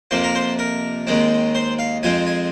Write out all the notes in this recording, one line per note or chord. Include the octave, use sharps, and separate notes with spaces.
F2 C3 F3 A#3 C5
A#4
C5
A#4
D#2 D#3 G#3 C4
C5
F5
F2 F3 G#3 C4 G#5
G#5